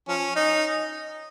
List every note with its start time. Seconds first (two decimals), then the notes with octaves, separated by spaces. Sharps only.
0.08 F3 C#4
0.36 D#4